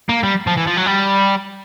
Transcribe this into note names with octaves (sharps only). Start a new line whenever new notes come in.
A#3
G3
F3
E3
F3
F#3
G3